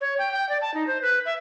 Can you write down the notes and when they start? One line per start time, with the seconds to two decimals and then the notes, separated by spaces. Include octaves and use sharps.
0.01 C#5
0.19 G5
0.32 G5
0.49 D5
0.61 A5
0.74 D#4
0.87 C5
1.02 B4
1.26 E5